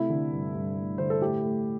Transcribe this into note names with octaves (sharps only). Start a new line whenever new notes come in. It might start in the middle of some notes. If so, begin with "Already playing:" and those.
Already playing: C3 A3 E4
D3
G2
G2
A3
D3 C5
A4
A2 G4
A3